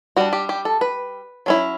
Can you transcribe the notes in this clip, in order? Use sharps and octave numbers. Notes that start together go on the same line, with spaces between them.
G3 D4 F#4
G4
G4
A4
B4
F#3 C#4 E4